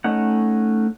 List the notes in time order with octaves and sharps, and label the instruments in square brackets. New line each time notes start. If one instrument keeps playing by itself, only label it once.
[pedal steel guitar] A3 C#4 D#4 F#5